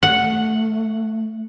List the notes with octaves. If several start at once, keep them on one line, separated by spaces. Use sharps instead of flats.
A3 F#5